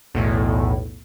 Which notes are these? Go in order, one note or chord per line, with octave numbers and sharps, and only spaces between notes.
B1 E2 A2